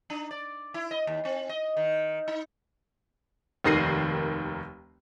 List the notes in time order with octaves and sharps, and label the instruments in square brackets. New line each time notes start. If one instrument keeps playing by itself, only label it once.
[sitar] D4
D5
E4
D#5
D#2
C4
D#5
D#3
D#4
[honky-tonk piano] F1 D#2 D#3 A#6 C7 D#7